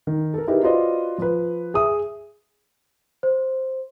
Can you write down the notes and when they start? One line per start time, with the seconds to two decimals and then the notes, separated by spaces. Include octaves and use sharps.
0.07 D#3
0.34 A4 A#4
0.47 D#4 E4 G4 G#4 A#4 B4
0.63 F4 F#4 B4 C5 D5 D#5
1.18 F3 B4
1.74 G#4 E5 D#6
3.23 C5